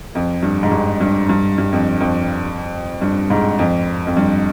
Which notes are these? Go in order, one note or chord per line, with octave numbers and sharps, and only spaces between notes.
F2
G2
G#2
G2
G2
G2
G2
F2
F2
G2
G#2
F2
F2
G2